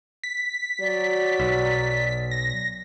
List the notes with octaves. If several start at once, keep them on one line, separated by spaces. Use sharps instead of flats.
B6
F#3 D5
B1
A#6